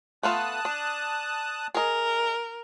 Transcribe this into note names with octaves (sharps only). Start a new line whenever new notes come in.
A3 B3 F4 A5 D#6 F#6
D4
G#4 A#4 D#5